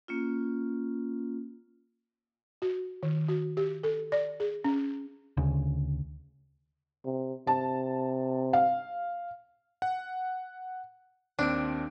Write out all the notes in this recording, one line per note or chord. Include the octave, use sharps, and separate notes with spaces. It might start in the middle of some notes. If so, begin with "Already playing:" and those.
A#3 C#4 F4
F#4
D#3
F#4
G4
A4
D5
G#4
C#4
D2 C#3
C3
C3 A5
F5
F#5
D#2 C4 D4 D7